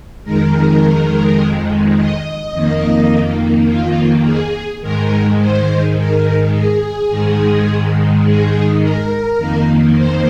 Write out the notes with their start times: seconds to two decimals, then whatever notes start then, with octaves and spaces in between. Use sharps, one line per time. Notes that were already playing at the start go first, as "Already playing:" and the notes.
0.24 F2 D#3 G#3 A#4
1.96 D#5
2.52 F2 D#3 A#3
3.67 F4
4.24 G#4
4.81 G#2 D#3 G#3 A#4
5.39 C5
5.96 A#4
6.53 G#4
7.10 G#2 D#3 G#3
8.25 G#4
8.81 A#4
9.38 F2 D#3 A#3
9.96 C5